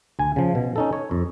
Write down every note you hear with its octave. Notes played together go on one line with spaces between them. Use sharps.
D2 G#5
C#3 F3
B2
C#4 D#4 A4
C#5
F2